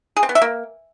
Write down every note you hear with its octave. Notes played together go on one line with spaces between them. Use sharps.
G#4
C4
B3
E5
A#3